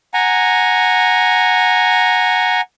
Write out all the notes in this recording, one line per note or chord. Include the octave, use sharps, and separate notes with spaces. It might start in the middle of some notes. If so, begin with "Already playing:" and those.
F#5 G#5 A#5